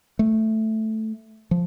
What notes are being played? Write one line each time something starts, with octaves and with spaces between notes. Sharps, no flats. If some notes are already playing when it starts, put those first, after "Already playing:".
A3
F3